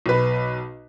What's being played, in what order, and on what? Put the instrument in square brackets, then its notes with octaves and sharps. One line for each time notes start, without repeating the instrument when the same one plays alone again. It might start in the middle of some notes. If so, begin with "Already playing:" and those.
[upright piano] B1 B4